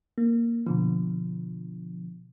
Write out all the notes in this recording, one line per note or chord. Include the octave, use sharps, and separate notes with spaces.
A#3
B2 D3 F3